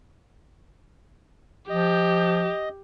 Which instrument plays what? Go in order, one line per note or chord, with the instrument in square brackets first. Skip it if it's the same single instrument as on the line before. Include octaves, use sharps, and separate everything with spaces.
[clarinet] F3 [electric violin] G4 [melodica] D#5